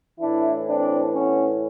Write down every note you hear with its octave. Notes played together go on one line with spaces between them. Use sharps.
A2 E3 D4 E4
C4 D4
B3 C#4